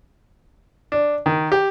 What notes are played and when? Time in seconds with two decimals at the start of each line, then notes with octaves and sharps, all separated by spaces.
0.92 D4
1.26 D#3
1.52 G4